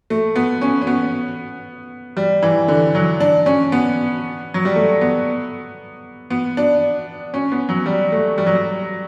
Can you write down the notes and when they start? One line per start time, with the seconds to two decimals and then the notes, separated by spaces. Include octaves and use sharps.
0.10 A3
0.36 B3
0.61 C#4
0.82 C#4
0.87 B3
2.17 G3
2.42 E3
2.68 D3
2.95 F#3
3.20 D4
3.46 C#4
3.72 B3
4.54 F#3
4.65 G3
4.76 A3
5.01 B3
6.30 B3
6.57 D4
7.34 C#4
7.52 B3
7.69 F#3
7.86 G3
8.12 A3
8.38 G3
8.46 F#3
8.55 G3